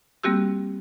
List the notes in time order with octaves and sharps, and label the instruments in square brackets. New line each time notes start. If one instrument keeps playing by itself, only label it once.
[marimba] G3 A#3 C4 F#4 G4 E6